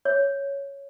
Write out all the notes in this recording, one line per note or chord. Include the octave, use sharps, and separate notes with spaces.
C#5